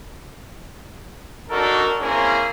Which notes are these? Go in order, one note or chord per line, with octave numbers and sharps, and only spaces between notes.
D4 D#4 F#4 A4 A#4
A#3 C4 C#4 E4 G#4 A#4